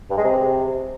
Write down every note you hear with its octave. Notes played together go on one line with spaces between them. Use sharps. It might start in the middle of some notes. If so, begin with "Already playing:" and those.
G2
G#3
C3